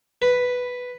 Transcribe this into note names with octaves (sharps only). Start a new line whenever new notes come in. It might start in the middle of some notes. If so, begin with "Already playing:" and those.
B4